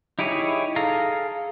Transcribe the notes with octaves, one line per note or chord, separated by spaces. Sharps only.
D#4 E4 G4 G#4 C#5
G#4 A4 F5 A#5